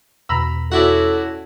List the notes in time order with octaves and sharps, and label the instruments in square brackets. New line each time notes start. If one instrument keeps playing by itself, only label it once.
[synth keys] E2 B2 [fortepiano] A#5 B5 E6
[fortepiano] C#4 E4 F#4 [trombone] A4 [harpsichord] D5 E5 F#5